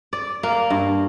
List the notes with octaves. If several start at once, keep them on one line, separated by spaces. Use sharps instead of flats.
D5
A#3
G2